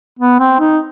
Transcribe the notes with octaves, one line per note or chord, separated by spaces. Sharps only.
B3
C4
D#4